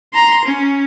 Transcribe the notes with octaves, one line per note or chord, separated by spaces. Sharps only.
A#5 C6
C#4